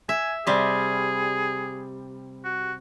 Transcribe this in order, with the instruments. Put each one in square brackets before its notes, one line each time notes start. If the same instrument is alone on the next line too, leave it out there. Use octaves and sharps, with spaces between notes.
[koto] E5 [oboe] G#5
[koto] C3 G3 [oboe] G#4
[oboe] F#4